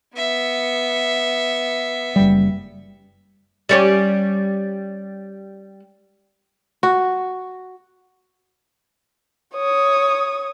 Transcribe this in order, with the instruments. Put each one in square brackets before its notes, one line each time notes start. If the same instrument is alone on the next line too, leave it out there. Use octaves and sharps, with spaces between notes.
[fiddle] B3 E5
[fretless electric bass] F#1 G3
[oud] G3 C#4 G4
[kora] F#4
[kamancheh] C#5 D#6